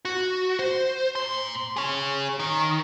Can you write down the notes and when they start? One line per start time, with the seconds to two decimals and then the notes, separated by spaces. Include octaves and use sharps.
0.05 F#4
0.59 C5
1.16 A#2 C6
1.77 G#4 C#5
2.39 D#3